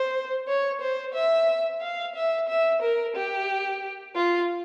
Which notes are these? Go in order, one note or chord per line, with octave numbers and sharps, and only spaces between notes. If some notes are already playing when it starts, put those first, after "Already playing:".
Already playing: C5
C#5
C5
E5
F5
E5
E5
A#4
G4
F4